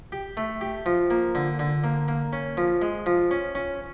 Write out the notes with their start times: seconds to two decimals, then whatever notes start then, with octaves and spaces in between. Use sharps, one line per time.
0.12 G4
0.37 A3
0.61 G4
0.86 F3
1.10 A#3
1.35 D3
1.59 D3
1.84 A#3
2.08 A#3
2.33 C#4
2.57 F3
2.82 G#3
3.06 F3
3.31 C#4
3.55 C#4